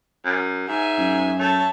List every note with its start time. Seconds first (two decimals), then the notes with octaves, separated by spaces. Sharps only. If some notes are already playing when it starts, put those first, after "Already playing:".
0.25 F#2
0.68 G#2 E5 G#5
0.98 F#2
1.39 A3 A4 C#5